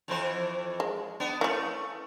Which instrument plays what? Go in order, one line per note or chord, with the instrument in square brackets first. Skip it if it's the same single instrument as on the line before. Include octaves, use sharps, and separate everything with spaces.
[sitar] F2 E3 C5
[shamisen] G#3
[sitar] B3 D4
[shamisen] E3 C#4 [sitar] A3